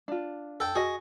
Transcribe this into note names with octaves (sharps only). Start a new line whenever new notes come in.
D4 F4
A4 G5
F#4 G#4 D#5